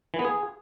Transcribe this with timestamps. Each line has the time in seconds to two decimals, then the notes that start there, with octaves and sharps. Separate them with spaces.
0.14 E3
0.19 B3
0.25 G#4